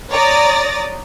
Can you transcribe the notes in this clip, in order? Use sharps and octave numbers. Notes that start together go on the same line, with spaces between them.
C#5 D5 A#5 D#6 A6 A#6